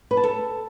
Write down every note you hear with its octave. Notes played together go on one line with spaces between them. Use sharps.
B4
A5
A4